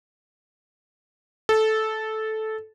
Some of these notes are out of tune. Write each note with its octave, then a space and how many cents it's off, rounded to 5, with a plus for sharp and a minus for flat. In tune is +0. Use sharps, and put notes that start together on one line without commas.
A4 -10